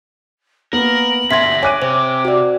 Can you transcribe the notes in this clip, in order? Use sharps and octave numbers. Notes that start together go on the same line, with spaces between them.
A#3 B3 A#4 F#7
G2 B2 D3 E5 C6 G#6 A#6 B6
C#5 G#5 D6 F#6 D#7
C3 C5
F#4 D5